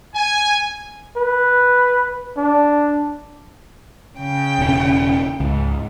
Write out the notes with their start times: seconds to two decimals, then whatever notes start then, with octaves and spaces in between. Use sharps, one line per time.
0.15 G#5
1.16 B4
2.37 D4
4.18 C#3 G5
4.59 E1 C#4
5.40 C#2 G#2